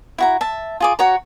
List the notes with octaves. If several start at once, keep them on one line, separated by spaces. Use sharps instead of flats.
E4 F#4 A#5
E5 A5
F4 G#4 D6
F#4 C#5 A#5